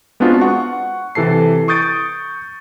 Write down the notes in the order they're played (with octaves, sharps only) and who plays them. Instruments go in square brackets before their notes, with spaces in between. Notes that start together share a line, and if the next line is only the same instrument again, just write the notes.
[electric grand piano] G#3 B3 C4 D4 F4 F#4
F#5 C#6
C3 E3 A4 A5 C7
C#6 D#6 G6 A6 D7